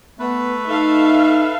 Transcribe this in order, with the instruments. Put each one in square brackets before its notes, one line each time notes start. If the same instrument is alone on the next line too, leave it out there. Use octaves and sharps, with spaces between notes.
[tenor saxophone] A3 [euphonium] B3 [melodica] B4
[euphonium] D#4 [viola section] A4 E5 F5